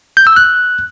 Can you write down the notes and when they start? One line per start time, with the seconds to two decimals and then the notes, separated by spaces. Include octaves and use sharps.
0.17 G6
0.27 E6
0.36 F#6